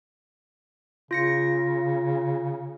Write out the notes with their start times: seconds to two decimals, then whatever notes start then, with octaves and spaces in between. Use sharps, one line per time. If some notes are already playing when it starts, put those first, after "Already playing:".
1.11 C#3 F4 A#6 C#7